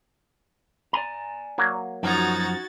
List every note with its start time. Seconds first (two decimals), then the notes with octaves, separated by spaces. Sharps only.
0.93 D5 G#5 A#5
1.58 F#3 A#3
2.03 F#2 F3 D#4 F#4 A#5 G#6 A6